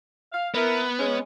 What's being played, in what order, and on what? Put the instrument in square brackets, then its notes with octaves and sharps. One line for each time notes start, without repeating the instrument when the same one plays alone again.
[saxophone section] F5
[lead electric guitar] B3 [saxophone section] E4 A#4
[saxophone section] G#3 C#4